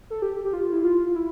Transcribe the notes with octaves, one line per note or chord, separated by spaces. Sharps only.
A4
G4
G4
F4
E4
F4
E4